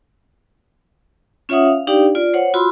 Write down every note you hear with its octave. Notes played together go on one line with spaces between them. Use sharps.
C#4 F4 C#5 E5 F#5 D#6
F5
D4 D#4 G4 D5 F5 G5
F4 D5
C5 C#5 F#5
F4 F#4 B5 C6 E6